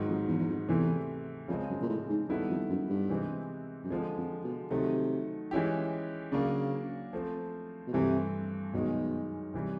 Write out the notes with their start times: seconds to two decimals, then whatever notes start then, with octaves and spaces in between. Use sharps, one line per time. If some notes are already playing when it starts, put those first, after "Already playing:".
Already playing: G#2 D#3 F#3
0.08 F2
0.28 E2
0.39 E2
0.48 F2
0.68 E2 C3 E3 A3
1.48 F2 C#3 F3 G#3 C4
1.69 F#2
1.82 A#2
1.89 A2
2.09 G#2
2.29 G2 D#3 G3 B3 E4 A4
2.49 F2
2.70 F#2
2.90 G2
3.10 C3 E3 G#3 C4
3.84 F#2
3.90 F2 D3 F3 G#3
4.17 F2
4.44 B2
4.71 C3 D#3 F#3 A3
5.51 E3 G#3 C#4 E4 G4
6.32 C#3 F#3 A#3 D4
7.13 F3 A3 C4
7.87 B2
7.93 G2 C3 E3 A3 C4
8.74 F#2 B2 D#3 G#3
9.54 C3 E3 G3